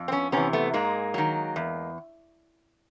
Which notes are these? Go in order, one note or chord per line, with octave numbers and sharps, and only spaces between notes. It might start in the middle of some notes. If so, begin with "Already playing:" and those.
Already playing: F2
C4
B3 C#4
C3 E3 B3 C#4
A3 B3
G#2 G#3 A#3
D#3 F#3
E2